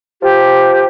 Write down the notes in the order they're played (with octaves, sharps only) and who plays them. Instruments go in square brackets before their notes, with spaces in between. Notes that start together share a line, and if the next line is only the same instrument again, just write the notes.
[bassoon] F3 [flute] G4